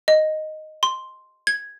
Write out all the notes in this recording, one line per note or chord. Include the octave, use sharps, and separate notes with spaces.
D#5
C6
G#6